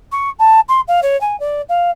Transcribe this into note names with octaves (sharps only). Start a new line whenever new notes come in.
C#6
A5
C6
F5
C#5
G#5
D5
F5